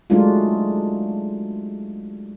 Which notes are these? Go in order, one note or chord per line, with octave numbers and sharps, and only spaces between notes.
F#3 G#3 A3 D4 D#4 F4